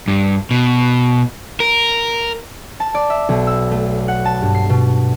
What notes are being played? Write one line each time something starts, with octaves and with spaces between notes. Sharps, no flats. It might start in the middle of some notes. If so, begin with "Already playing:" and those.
G2
B2
A#4
A5
D5
E5
B1
E6
A3
F#5
A5
G2
C7
B2